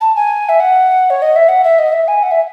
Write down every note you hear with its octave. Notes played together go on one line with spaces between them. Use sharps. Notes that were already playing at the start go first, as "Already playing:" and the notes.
A5
G#5
E5
F#5
C#5
D#5
E5
F#5
E5
D#5
E5
G#5
F#5
E5